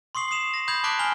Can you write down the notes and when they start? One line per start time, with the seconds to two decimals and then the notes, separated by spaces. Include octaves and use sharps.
0.15 C6 C#6 D#6 C7 F#7
0.31 D#6 C7 E7 F7
0.54 A#6
0.68 B5 D#6 G6 G#6 F#7
0.84 A5 C#6 D6 F#6 B6 D7
0.99 G#5 B5 F6 G7